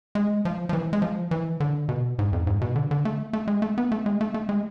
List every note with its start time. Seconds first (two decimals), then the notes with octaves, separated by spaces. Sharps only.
0.15 G#3
0.45 F3
0.69 F3
0.73 E3
0.93 G#3
1.02 F3
1.31 E3
1.60 D3
1.89 B2
2.19 G#2
2.33 F2
2.47 G#2
2.61 B2
2.76 D3
2.91 D3
3.05 A3
3.33 A3
3.48 G#3
3.62 A3
3.78 B3
3.92 A3
4.06 G#3
4.21 A3
4.34 A3
4.49 G#3